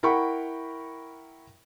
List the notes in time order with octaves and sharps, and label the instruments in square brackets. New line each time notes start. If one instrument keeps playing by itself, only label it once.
[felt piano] E4 A#4 F#5 G5 B5 C#6